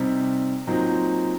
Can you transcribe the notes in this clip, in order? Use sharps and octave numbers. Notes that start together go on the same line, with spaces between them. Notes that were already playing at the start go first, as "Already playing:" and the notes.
Already playing: C3 G3 C4 D#4
A#2 F#3 C4 D#4